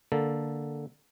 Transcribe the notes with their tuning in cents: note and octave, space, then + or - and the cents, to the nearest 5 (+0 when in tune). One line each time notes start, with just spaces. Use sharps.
D3 +0 A#3 +0 A4 +0